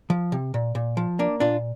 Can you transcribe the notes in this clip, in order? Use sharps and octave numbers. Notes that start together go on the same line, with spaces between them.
F3
C3
A#2
A#2
F3
A#3 D4
A#2 D4 F4